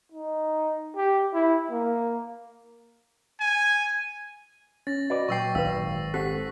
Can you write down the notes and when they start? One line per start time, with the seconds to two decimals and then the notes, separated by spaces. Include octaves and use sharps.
0.12 D#4
0.96 G4
1.34 E4
1.71 A#3
3.40 G#5
4.87 C#4 A6 A#6
5.10 F#4 B4 D5 D#5
5.29 A#2 F#3 G5 C#6 E6 C7
5.55 G#1 B4 F5 E6
6.14 C4 G4 A4 F#5 F#6 B6